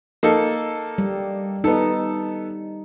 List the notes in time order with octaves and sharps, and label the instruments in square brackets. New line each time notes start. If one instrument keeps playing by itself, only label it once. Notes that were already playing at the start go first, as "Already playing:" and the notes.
[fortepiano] A#3 D#4 A4
[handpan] G3
[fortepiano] B3 A4 [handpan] D#4